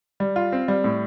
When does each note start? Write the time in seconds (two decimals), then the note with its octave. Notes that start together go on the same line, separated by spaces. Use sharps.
0.20 G3
0.36 F4
0.52 C4
0.68 G3
0.84 A2